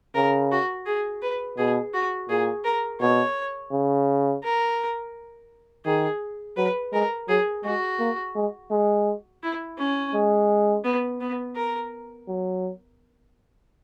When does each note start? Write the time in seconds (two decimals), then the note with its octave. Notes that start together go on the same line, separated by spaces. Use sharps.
0.15 C#3 A#4
0.52 F#4
0.86 G#4
1.22 B4
1.57 B2 G#4
1.94 F#4
2.29 A#2 G#4
2.64 A#4
3.01 B2 C#5
3.72 C#3
4.43 A#4
5.85 D#3 G#4
6.57 F#3 B4
6.93 G#3 A#4
7.28 F#3 G#4
7.64 G#3 F#4
7.99 A#3
8.36 G#3
8.71 G#3
9.43 E4
9.78 C#4
10.14 G#3
10.84 B3
11.21 B3
11.56 A#4
12.28 F#3